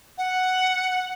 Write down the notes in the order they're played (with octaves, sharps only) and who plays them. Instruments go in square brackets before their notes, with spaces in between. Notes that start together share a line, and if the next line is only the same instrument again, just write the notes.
[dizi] F#5